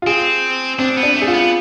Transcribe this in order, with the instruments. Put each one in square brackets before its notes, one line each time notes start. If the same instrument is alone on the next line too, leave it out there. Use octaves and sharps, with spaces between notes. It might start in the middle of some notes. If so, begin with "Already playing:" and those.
[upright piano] F4
[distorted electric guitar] C4 [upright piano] G#4
[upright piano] C4 [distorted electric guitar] D4
[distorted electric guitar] B3
[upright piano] D4
[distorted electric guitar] A3
[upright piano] G#4
F4
[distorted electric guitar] B3